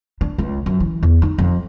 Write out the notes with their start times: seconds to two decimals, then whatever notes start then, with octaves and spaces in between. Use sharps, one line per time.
0.21 D4
0.38 C#2
0.66 F#2
0.80 E3
1.03 E2
1.22 D#4
1.38 F2